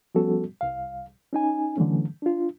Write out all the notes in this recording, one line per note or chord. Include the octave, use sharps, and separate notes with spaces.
F3 G3 B3 C#4 F#4 A4
C2 F5
C#4 D#4 G#5
D3 E3 F#3 A3 C#4
D4 F4